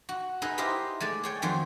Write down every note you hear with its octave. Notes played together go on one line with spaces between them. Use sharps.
F#4
D#4 G#4 B4 D#5 E5
E4 G4 A#4 C5 D#5 E5
G#3 A3 D5
G#4 C#5 G5
F2 D#3 F#3 C5 C6